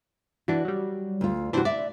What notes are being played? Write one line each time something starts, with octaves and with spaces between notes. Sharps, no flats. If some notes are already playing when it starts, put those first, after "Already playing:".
E3 D4 F#4
F#3 G3
D2 F4
C3 E3 D4 F#4 C5
D5 E5